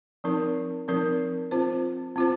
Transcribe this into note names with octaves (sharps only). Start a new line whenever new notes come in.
F3 C4 D#4 A#4
F3 C4 D#4 A#4
C4 F4 C5
C4 F4 C5